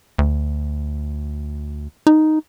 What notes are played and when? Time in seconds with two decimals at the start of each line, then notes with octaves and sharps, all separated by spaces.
0.18 D2
2.07 D#4